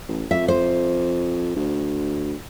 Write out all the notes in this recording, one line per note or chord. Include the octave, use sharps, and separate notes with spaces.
A1
F2 E5
C5
D2